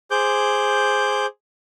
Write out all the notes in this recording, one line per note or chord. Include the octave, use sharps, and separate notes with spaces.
G#4 C5 D6 G6